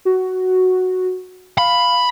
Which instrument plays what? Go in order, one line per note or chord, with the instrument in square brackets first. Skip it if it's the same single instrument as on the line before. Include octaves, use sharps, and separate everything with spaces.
[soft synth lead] F#4
[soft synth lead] F5 [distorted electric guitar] B5